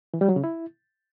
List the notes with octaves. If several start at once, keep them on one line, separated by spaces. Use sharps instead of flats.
E3
G3
F#3
C#3
E4